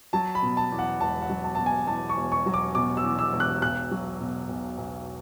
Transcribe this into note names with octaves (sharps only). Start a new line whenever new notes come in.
F#3 A5
B5
B2
A5
E2
F#5
E1 A5
F#5
F#3
A5
B2 A5
G#5
E2 A5
C#6
E1
C#6
F#3
D6
B2 D6
E6
E2
E6
E1
F#6
B1 F#6
F#3
B2
B1
B1